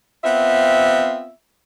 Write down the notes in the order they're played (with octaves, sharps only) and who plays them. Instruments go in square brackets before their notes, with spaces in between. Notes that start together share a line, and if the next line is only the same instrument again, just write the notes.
[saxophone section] B3 C4 F4 E5